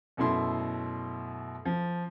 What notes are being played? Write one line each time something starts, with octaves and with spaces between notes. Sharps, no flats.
F#2 B2 A3 E4 C6
F3